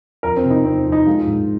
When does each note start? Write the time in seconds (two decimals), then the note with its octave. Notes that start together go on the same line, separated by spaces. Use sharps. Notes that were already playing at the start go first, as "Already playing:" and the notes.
0.23 F2 A#4
0.37 C4
0.44 C3
0.50 D#4
0.64 F2 C4
0.85 F2
0.92 D#4
1.07 G#3 F4
1.27 G#2